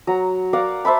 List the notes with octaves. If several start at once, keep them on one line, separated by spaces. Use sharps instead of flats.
F#3 A#5
A#4 D5 F5 F#5
C5 E5 A5 B5